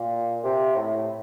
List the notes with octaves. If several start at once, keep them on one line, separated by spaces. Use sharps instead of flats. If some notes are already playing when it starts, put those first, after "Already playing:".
Already playing: A#2
C3
A2